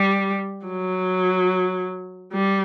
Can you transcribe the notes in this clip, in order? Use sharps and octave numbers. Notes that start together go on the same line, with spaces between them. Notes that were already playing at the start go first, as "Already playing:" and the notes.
Already playing: G3
F#3
G3